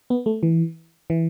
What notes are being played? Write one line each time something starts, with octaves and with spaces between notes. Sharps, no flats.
B3
A3
E3
E3